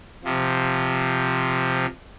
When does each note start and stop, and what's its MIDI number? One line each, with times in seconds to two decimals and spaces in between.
0.24 1.86 48
0.24 1.86 53